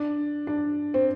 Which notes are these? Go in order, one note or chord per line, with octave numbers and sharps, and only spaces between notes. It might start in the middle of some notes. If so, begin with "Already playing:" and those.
Already playing: D4
D4
C4